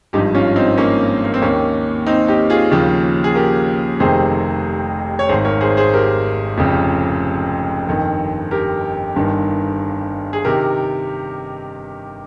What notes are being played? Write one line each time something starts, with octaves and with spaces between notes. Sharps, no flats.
G#1 G2 F3 D#4 G4
C#4 F4
C4 D#4
A#3 C#4
A#3
C4
D#2 D#3 A#3 C#4
C4 D#4
D#4 G4
F4 G#4
D#2 C#3 F3
G#4
G4 A#4
F1 F2 C3 D#3 G#4 C5
C#5
G#1 G#2 D#3 G#4 C5
A#4 C#5
G#4 C5
G#4 C5
G4 A#4
F1 F2 C#3 F3
G1 F2 D#3
G4 A#4
G1 G2 D#3
G#4
C3 D#3 G4 A#4